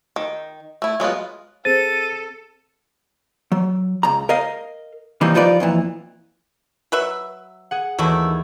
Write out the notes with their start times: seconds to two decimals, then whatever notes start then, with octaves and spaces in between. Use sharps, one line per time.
0.16 D#3
0.82 A3 E4
1.00 F#3 G#3 B3 F4
1.65 C4 G#4 A4 C5 A6 D#7
3.52 F#3
4.03 C#2 A#5
4.29 A#4 D#5 F5
5.21 C3 D#3 E3 G3 A#3 D#4
5.34 G2 F3 D#4 F4 B4 D5
5.60 F2 A#2 E3
6.92 F#3 B4 E5
7.71 G#4 F#5
7.99 D#2 E3 F#3 A3 E4